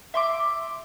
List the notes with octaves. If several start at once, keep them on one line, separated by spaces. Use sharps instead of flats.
E5 C6 D6